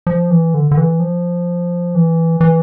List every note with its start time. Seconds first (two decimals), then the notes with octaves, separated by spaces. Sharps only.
0.07 F3
0.30 E3
0.54 D3
0.71 D3
0.77 E3
1.00 F3
1.95 E3
2.41 E3